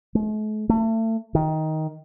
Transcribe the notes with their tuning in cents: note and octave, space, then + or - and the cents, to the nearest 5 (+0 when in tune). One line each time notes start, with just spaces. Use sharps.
A3 -45
A3 +30
D#3 +10